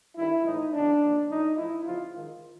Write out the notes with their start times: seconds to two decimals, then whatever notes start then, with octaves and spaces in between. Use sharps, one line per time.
0.16 G2 D#3 E4
0.45 A2 E3 D#4
0.72 E2 C#3 E3 D4
1.01 A#2 F3
1.30 A2 F3 D#4
1.57 A2 F3 E4
1.86 E2 C#3 F3 F4
2.14 G#2 D#3